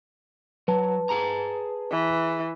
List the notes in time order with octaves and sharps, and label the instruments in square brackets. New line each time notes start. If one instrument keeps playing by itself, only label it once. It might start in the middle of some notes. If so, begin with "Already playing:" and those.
[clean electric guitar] F#3 [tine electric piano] B4 A5
[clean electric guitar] G#4 A#5
[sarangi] E3